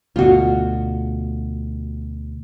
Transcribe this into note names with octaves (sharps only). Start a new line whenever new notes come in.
D2 B2 F4 F#4